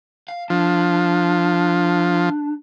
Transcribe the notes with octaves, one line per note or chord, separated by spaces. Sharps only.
F5
F3 D4